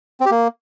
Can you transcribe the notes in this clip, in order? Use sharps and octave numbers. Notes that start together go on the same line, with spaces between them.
C4
G4
A#3